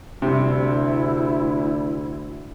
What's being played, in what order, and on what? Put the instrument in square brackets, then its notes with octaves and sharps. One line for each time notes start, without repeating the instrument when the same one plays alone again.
[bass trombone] D2 [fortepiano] G2 C3 [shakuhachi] E4